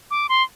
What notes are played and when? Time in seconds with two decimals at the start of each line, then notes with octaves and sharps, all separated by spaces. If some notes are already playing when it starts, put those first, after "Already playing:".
0.11 D6
0.29 C6